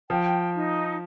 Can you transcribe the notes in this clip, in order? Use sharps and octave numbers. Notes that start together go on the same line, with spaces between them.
F3 G5
D#4